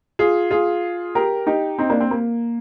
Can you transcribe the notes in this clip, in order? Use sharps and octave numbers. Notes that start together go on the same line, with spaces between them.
F4 G#4
F4 G#4
G4 A#4
D#4 G4
C4 D#4
A#3 D4
C4
A#3